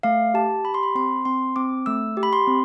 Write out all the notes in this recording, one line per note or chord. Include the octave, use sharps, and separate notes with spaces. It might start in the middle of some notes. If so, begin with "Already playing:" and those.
A3 F5
G4 A5
G4 B5
C6
B5
C4 C6
C4 C6
C4 D6
A3 E6
G4
B5
C6
C4